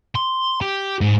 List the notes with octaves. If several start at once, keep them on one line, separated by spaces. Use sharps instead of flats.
C6
G4
G#2